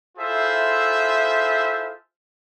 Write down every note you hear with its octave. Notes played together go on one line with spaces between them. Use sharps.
E4 F4 G#4 A4 C5 E5